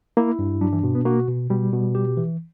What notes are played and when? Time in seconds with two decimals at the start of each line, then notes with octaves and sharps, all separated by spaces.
0.17 A#3 E4
0.39 G2
0.61 F#3 D4
0.73 E3
0.83 B2
0.95 B3
1.05 A#3 F#4
1.28 B2
1.50 B2 G3
1.73 B2
1.95 G4
2.17 E3